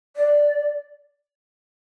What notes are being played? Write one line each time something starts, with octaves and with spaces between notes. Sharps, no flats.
D5